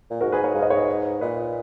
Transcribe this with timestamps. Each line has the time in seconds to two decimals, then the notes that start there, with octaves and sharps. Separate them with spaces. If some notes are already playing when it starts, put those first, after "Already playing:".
0.11 A#2
0.21 G#2 F#4 A#4
0.32 G#4 B4
0.44 A#4 C#5
0.54 G#2 F5
0.62 D#5
0.70 C#5
0.77 B4 D#5
1.21 A#2 B4 D#5